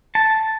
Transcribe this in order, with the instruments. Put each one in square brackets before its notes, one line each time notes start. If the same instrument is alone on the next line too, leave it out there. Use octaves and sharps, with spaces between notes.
[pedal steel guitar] A5